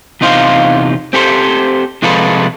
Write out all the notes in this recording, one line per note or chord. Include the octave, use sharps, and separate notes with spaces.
E2 C3 D#4 F4 C5 F5
C4 G4 A4 C5
C3 F3 G#3 F4 A4 B4